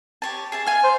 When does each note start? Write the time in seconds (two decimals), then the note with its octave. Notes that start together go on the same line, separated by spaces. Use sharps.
0.22 G4 C#5 A5
0.52 G#4 E5 A5
0.66 F5 G#5
0.84 C5